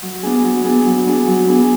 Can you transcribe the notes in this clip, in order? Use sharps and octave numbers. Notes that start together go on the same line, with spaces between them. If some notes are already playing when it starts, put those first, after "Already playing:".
F#3
B3 D4 G#4
F#3
B3 D4 G#4
F#3
B3 D4 G#4
F#3
B3 D4 G#4